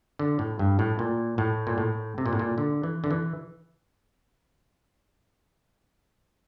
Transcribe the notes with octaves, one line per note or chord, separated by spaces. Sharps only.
D3
A2
G2
A2
A#2
A2
A#2
A2
C3
A#2
A2
A#2
D3
E3
D3
E3